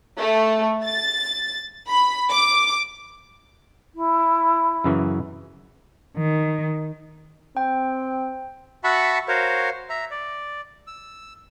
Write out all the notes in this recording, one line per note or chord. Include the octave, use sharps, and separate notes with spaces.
A3
A6
B5
D6
E4
F#2 C#3 E3
D#3
C4 G5
F#4 E5 F#5 A5 B5 C#6
F#4 A#4 C5 C#5 F5
E5 A#5
D5
E6